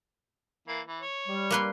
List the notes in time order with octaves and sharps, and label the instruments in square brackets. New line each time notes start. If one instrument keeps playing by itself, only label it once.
[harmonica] E3 A#3
E3
C#5
[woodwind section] G3
[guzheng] A#3 B4 C6